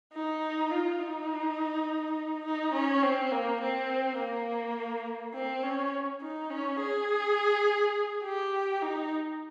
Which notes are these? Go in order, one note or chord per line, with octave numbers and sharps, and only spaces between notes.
D#4
F4
D#4
D#4
C#4
C4
A#3
C4
A#3
C4
C#4
D#4
C#4
G#4
G4
D#4